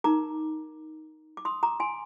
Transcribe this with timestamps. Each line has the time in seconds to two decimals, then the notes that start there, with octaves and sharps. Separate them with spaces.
0.04 D#4 A#4 A#5 D6
1.37 D6
1.45 C6 D#6
1.63 A#5 D6
1.80 G#5 C6